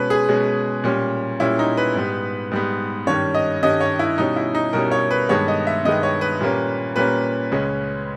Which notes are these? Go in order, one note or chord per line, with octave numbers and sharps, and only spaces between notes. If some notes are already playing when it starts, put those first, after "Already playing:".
Already playing: B2 G#3 C#4 B4
G#4
B2 G#3 C#4
A#2 G3 C#4
A#2 G3 C#4 E4
D#4
B4
G#2 G3 B3
G#2 G3 B3
G2 D#3 G3 C#4 C#5
D#5
G2 D#3 G3 C#4 D#5
C#5
E4
B2 G3 C#4 D#4
E4
D#4
B2 G3 C#4 A#4
C#5
B4
G2 D#3 G#3 B3 C#5
D#5
E5
G2 D#3 G#3 B3 D#5
C#5
B4
A#2 G3 A#3 C#4
A#2 G3 A#3 C#4 B4
C#2 C#3 G#3 C#4